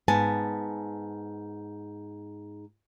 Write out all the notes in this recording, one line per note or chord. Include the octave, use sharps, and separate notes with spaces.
G#2 B3 G#5 A5